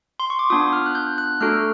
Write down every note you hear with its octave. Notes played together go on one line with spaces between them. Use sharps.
C6
C#6
D6
B3 D4 F4 D#6
F6
F#6
G6
F#6
A3 D4 F#4 A4 F6